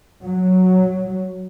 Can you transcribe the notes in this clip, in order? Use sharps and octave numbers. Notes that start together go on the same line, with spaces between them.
F#3